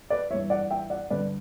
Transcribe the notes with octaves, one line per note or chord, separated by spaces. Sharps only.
B4 D5
G2 E3 C#5 E5
D5 F#5
E5 G5
D5 F#5
G2 D3 B4 D5